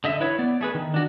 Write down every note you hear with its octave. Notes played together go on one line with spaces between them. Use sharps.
D3 D#5 E5
E4 B4 C#5
B3 D5
A3 G#4 B4
D#3
D4 F#4